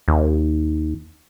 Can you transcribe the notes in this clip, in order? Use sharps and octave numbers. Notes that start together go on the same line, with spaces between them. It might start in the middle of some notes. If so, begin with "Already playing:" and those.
D#2